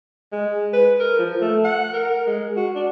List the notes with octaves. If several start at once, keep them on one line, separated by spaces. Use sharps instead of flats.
G#3
B4
A#4
F3
A3
F#5
A#4
G#3
F#4
D4